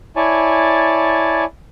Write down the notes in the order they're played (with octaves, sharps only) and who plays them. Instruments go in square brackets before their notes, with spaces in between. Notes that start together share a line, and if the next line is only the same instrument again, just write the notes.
[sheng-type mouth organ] E4 C#5 D5 G#5 A5